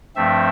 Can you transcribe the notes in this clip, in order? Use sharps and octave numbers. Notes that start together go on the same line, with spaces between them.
G2 F3 A3 C4 E5